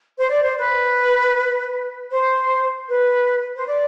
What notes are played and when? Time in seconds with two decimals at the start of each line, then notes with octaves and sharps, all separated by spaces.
0.18 C5
0.30 D5
0.43 C5
0.57 B4
2.11 C5
2.89 B4
3.56 C5
3.66 D5